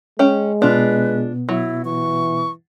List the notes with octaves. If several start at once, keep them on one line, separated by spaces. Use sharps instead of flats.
G#3 C#4 G5
B2 B3 D4 F4 B4
F#3 E4
E3 C#6